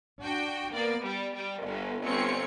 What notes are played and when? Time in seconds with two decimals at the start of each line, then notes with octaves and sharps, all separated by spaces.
0.21 D4 F#4 G5
0.72 A#3 B3 D5
1.03 G3
1.34 G3
1.64 G1
2.03 G1 C4 C#5 C#7